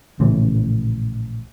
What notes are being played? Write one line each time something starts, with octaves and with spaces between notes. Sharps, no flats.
A#1 A2 C#3 E3